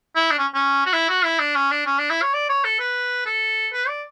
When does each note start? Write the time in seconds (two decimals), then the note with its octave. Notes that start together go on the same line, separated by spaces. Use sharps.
0.15 E4
0.31 D4
0.39 C#4
0.54 C#4
0.86 F#4
0.93 E4
1.09 F#4
1.24 E4
1.39 D4
1.55 C#4
1.71 D4
1.86 C#4
1.99 D4
2.10 E4
2.22 C#5
2.34 D5
2.49 C#5
2.65 A4
2.79 B4
3.26 A4
3.73 B4
3.88 D5